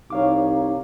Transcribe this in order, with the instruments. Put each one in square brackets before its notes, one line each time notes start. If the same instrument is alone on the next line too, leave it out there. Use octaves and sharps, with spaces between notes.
[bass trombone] C2 [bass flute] D#4 [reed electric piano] C#5 F5 D6